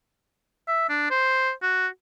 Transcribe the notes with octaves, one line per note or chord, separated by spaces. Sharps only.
E5
D4
C5
F#4